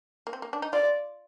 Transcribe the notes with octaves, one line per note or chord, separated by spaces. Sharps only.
A#3
C4
A#3
D4
D#4
F4 D5